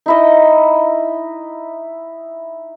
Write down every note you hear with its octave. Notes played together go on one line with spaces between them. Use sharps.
D#4 E4 D#5